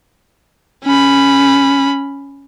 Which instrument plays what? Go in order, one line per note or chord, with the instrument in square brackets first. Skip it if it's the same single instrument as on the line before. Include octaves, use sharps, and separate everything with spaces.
[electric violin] C#4 B5